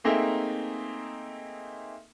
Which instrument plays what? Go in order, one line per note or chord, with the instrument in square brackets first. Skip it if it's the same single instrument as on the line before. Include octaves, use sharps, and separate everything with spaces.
[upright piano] A3 A#3 C4 D#4 G#4 E5